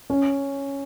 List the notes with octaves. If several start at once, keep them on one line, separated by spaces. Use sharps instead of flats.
C#4